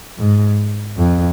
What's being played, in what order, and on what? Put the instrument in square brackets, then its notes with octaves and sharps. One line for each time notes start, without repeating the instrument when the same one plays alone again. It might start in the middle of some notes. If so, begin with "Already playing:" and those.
[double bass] G#2
F2